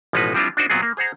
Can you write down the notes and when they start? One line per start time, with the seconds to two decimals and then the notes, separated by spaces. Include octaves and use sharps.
0.13 A1 B2 F3 G#3 D#4 B4
0.34 F3 G3 C4 D4 E4 F4
0.57 D4 D#4 F#4 C5
0.70 A#2 F#3 B3 C4 G#4
0.83 A#3
0.97 G#4 C5 F#5 A#5